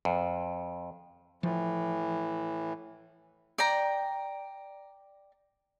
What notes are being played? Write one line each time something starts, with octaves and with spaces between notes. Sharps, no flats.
F2
A2 E3 F3
D5 G5 A#5